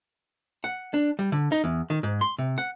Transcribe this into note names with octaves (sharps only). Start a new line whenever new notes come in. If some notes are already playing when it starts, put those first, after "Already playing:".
F#5
D4
G3
D3
D#4
E2
D#3
G#2
C6
C3
F#5